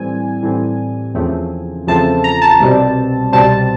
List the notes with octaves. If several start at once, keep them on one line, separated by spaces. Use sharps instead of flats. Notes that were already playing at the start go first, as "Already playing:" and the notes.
Already playing: A2 E3 G3 C4 G#5
A2 E3 G3 C4
E2 C#3 F3 A3 C4
E2 C#3 F3 A3 C4 A5
A#5
A5
C2 B2 G3 C4
C2 B2 G3 C4 A5